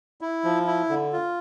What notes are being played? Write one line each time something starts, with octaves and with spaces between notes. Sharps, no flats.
E4
F3
E4
D3
F4